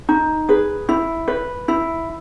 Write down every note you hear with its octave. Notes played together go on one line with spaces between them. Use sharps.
D#4
G#4 B4
E4
B4
E4